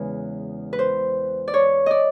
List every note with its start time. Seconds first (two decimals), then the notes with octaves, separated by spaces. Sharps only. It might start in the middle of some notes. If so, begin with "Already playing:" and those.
Already playing: E2 C#3 E3 G#3 B4
0.73 B4
0.79 C5
1.48 D5
1.54 C#5
1.86 D5 D#5